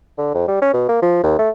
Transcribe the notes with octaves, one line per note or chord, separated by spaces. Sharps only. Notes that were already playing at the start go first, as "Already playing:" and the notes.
D3
F2
G3
C#4
B2
A#3
F3
D#2
A3